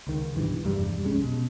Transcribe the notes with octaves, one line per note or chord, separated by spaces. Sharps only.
C#2 D#3
B1 G2 E3
F1 E2 G2 G3
B1 F2 G#3 C#4
B2